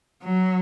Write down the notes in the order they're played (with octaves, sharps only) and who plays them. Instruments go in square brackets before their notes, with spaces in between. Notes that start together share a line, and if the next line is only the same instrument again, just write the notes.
[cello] F#3